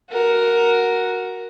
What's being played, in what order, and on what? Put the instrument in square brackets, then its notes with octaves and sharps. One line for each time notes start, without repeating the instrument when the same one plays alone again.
[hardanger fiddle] F#4 A#4